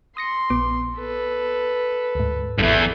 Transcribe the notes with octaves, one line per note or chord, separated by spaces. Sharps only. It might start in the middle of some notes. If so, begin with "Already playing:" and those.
C6 D#6 A#6 C#7
A#1 B3 D6
A4 B4
D2 G#2
A1 E2 G2 E4 A4